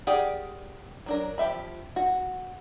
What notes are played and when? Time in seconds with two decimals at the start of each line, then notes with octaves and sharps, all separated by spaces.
0.07 G4 G#4 A#4 D5 F#5
1.06 F#3 D4 A#4
1.38 F3 G4 E5 B5
1.96 F#4